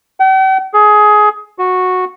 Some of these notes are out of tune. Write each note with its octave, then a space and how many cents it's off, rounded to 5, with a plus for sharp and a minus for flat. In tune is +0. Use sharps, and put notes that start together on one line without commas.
G5 -45
G#4 +20
F#4 -10